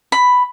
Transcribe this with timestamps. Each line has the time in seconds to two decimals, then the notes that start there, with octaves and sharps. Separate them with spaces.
0.12 B5